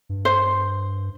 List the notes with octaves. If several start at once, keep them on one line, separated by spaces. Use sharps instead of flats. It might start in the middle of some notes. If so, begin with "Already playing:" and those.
G2
C5